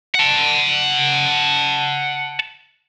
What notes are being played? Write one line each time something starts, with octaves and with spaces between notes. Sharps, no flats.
F#5 A5